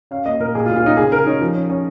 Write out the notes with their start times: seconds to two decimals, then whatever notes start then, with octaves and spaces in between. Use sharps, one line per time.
0.11 C#4 F5
0.26 A#3 D#5
0.40 A#2 A#4
0.55 A#2 G#4
0.66 F4
0.69 A#2
0.76 F4
0.83 C#4 D#4
0.97 C#3 G#4
1.12 C#3 A#4
1.26 C#4 D#4
1.41 F3
1.55 C#4
1.69 C#4